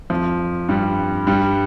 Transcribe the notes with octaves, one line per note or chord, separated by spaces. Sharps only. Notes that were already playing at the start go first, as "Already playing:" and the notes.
F2 F3
G2 G3
G2 G3